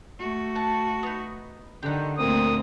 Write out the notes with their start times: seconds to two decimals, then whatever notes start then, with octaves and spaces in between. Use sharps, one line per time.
0.19 A3 F#4
0.55 F#5 A5
1.03 B3 D#4
1.83 D3 D#3 G4 F#5
2.18 D2 A#2 A3 A#3 C4 D#6